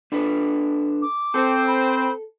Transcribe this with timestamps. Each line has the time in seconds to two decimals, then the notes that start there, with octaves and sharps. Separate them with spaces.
0.12 D4 A4 B4
1.02 D6
1.34 C4 A4
1.67 B5